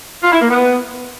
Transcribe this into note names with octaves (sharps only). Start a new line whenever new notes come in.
F4
E4
A#3
B3